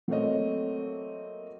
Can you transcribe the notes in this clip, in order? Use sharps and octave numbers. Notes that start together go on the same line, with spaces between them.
F#3 A3 A#3 C4 C#5 D#5